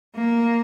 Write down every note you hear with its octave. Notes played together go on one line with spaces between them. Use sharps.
A#3